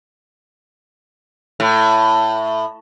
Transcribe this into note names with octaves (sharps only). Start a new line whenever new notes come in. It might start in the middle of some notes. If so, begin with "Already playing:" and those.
A2